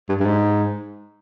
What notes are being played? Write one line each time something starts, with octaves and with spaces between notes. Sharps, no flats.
G2
G2
G#2